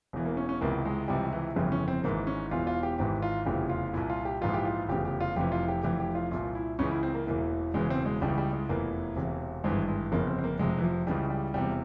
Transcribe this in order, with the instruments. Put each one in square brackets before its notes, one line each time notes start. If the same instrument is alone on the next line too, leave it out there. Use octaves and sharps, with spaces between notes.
[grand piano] E1 E2 E3
A#3
C#4
C#4
C#2 C3 E3 A#3
G#3
C#2 C3 E3 G3
E3
G1 F2 C#3 E3 G3
C#4
C4
G#1 G#2 E3 A#3
C#4
E1 E2 E3 F4
F4
G4
G#1 G#2 E3 G4
F4
F1 E2 C#3 E3 G4
F4
C2 A#2 E4
F4
G4
A#1 G#2 E3 F4
G4
F4
F1 E2 C#3 G4
G4
F4
F1 F2 C3 E3 G4
F4
G4
F1 F2 E3 G4
G4
F4
C2 A#2 F4
E4
C#2 C#3 E3 C#4
E4
C4
A#3
E1 E2 E3 A#3
E1 E2 C#3 E3 G#3
C4
G#3
C#2 C#3 E3 G3
G3
G#3
F1 E2 E3 A#3
E1 E2 C3 E3
G#1 G2 E3 G#3
G#3
G1 F2 C#3 A#3
C4
C4
A#3
F1 F2 C3 G#3
E3
F3
C#2 C#3 E3 G3
G3
E1 E2 C3 G3